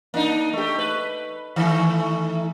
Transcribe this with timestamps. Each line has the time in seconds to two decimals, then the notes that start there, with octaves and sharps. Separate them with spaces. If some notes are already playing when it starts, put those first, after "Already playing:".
0.14 A#3 D4 D#4
0.53 A3 G4
0.78 B4
1.56 D#3 E3 A3